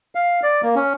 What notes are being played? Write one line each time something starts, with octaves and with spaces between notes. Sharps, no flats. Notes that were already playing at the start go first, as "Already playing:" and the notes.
F5
D5
A#3
C#4